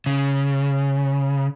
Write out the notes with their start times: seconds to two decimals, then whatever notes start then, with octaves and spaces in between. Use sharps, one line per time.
0.06 C#3